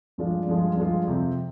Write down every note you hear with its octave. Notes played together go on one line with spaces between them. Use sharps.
G2 F3 G#3 D4 F4
G2 F3 G#3 D4 F4
G2 F3 G#3 D4 F4
F2 C3 F3 C4